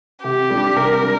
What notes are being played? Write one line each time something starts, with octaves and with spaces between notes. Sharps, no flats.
C3 G4
G3 D4
C3 A#4
G3 D4